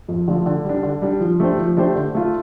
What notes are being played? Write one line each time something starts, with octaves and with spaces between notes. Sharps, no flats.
F2
D3 F3 A3 F4
D3
G3 D4
D3
G3 D4
F3
A3 D4 G4 C5
F3
A3 D4 G4 C5
D3
A3 F4